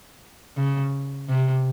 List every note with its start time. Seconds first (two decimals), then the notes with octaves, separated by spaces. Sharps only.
0.57 C#3
1.29 C3